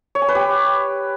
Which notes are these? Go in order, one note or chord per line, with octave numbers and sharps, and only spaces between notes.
C#5
G#5
B4
G4